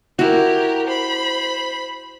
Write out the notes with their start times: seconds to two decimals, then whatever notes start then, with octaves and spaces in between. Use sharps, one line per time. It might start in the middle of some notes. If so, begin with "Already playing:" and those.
0.19 E4 F#4 G4 A#4
0.87 C5 B5